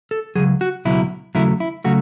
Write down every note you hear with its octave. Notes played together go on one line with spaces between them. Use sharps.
A4
C#2 B2 F#3 G#4
F#4
C#2 B2 F#3 E4
D#2 C#3 F#3 A3 E4
E4
C#3 F#3 A3 F#4